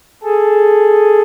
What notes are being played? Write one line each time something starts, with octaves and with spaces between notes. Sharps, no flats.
G#4 A4